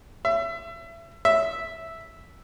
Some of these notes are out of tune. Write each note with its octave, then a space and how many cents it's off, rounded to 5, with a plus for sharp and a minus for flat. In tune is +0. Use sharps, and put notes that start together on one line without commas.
E5 +25
E5 -5